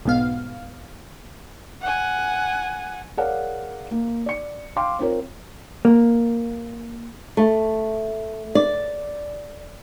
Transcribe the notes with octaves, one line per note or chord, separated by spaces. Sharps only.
B1 G#2 B3 F5
F#5 G#5
G#4 A#4 C#5 D5 F5 F#5
A#3
D5 C#7
F5 G5 C6 D6
C4 F4 A#4 C#5
A#3
A3
D5